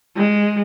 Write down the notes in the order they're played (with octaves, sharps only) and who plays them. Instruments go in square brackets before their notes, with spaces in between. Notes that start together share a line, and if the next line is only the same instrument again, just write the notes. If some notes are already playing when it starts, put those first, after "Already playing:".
[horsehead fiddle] G#3